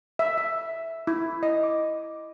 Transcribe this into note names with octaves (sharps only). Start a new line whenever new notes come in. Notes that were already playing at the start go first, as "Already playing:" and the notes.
E5
E5
E4
D#5
D6